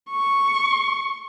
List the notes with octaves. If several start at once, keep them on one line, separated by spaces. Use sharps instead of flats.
C#6